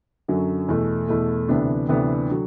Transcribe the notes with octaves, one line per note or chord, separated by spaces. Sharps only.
F#2 D3 F#3
E2 B2 A3
E2 B2 A3
D2 C3 E3 B3 D4
D2 C3 E3 B3 D4
D3 F#3